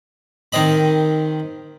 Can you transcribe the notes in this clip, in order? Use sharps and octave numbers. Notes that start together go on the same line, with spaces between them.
D#3 C4 D#5 B5